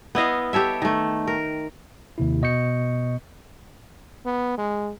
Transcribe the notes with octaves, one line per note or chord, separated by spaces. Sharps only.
B3 E4 D#5 F5
G4 A4 C#5 E5
D#3 A3
A#4
D#2 C3 E4
B2 B3 D#5 C#6 G6 C#7
B3
G#3